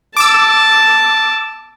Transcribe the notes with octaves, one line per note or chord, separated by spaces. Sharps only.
A5 D6 E6